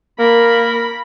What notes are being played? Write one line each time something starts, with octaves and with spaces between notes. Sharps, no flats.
A#3 A#4 B5